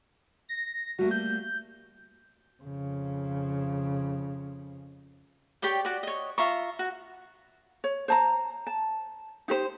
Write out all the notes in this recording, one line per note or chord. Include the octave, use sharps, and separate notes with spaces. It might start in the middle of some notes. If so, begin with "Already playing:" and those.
A#6
G3 A3 A#3 F#4
G6
F2 C#3
G4 C#5 D5 G5
F#4 D5
C#5 D#5
F4 E5 A#5 C#6
F#4
C#5
C5 A5 A#5
A5
D#4 G4 C5